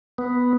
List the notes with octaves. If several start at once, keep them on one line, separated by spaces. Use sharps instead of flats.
B3